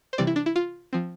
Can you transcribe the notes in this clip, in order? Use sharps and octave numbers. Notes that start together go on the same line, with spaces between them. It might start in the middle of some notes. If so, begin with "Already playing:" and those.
C5
C3 E3 G3 C4 D5
E4
D4
E4
F4
F3 C4